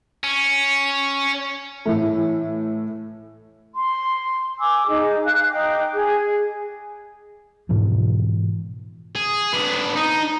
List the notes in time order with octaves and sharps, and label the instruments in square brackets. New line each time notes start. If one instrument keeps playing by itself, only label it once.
[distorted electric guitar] C#4
[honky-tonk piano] A2 E3 A3
[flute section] C6
G#5 D6 E6
D#4 G#4
F5 F#6
D#4 G5 D6
G#4
[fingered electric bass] G#2 B2 E3 F3
[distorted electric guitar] G#4
B3 D4
D#4